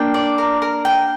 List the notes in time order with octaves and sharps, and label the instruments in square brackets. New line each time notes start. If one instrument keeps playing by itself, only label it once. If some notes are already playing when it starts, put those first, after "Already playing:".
Already playing: [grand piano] A#3 D4 [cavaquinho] G5
[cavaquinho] D5
A#4
A#4
G5